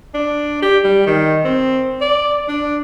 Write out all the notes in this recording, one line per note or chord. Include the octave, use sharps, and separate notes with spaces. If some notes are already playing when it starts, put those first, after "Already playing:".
D4
G4
G3
D#3
C4
D5
D4